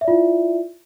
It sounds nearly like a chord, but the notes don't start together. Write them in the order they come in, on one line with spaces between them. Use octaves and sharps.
E5 D5 F4 E4